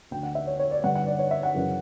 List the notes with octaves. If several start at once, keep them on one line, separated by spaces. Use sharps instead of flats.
D2 D3 G5
F#5
E5
C#5
C#5
D5
G2 D3 F#5
F#5
D5
C#5
E5
F#5
F#2 C#3 E3